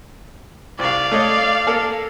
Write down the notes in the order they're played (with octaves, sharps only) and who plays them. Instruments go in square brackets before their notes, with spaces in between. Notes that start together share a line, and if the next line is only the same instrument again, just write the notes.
[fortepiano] C2 [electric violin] D5 F5
[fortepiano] A3 C#5 D#5
A#3 A4 A#4